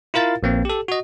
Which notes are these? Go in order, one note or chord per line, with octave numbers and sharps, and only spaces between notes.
E4 F4 A#4 F5 A6
A#1 A#3 C4
G4 A4
F#4 D#5